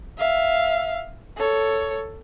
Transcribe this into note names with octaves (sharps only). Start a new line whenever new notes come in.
E5 F5
A4 C#5